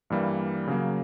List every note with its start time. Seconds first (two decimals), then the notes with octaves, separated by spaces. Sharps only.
0.10 G2 E3 G3 A#3
0.67 C#3 F#3 A#3